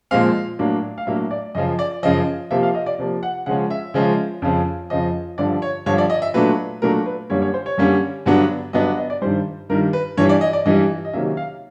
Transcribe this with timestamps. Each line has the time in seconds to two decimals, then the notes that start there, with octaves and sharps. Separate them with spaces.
0.11 A#2 F3 G#3 C4 F5
0.59 A2 F#3 A#3 D4
0.98 F5
1.07 A2 F#3 A#3 D4 E5
1.31 D5
1.55 F#2 C#3 F3 D#5
1.79 D5
2.03 F#2 C#3 F3 D#5
2.51 C3 F3 A#3 E5
2.63 F5
2.75 D#5
2.86 D5
2.99 C3 F3 A#3
3.23 F#5
3.46 C#3 F3 G#3 C#4 F#5
3.70 E5
3.94 C#3 F3 G#3 C#4
4.42 F2 C#3 F3
4.90 F2 C#3 F3 D#5
5.38 G2 D3 F3 D5
5.62 C#5
5.86 G2 D3 F3 C#5
5.98 D5
6.10 D#5
6.22 E5
6.34 A#2 F#3 A3 D4 B4
6.82 A#2 F#3 A3 D4 A#4
7.06 B4
7.30 F#2 D3 G3 A#3 C#4 C#5
7.42 C#5
7.54 C5
7.66 C#5
7.78 F#2 D3 G3 A#3 C#4
8.26 G2 D3 F#3 B3 D4
8.73 G2 D3 F#3 B3 D4 D#5
8.98 D#5
9.10 D5
9.21 G2 D#3 G3 C5
9.69 G2 D#3 G3 A#4
9.93 B4
10.17 G2 E3 G3 C#5
10.29 D5
10.41 D#5
10.53 D5
10.65 G2 E3 G3 D#5
11.05 D#5
11.13 C3 D#3 F#3 A#3 C#4 E5
11.37 F5